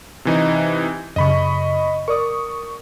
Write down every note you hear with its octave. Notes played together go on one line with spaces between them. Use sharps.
C3 E3 D#4
F#2 C#3 D#5 B5 C#6
A#4 D5 C#6 D#6